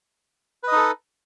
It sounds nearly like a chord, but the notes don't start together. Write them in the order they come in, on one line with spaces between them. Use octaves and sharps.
B4 D#5 D#4 A4